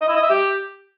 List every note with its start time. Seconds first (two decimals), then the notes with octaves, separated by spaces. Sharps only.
0.01 D#5
0.08 E4
0.15 D#5
0.23 E5
0.30 G4